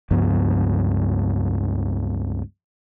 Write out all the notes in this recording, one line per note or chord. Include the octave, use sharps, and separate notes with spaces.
C#2 G2 F3 B3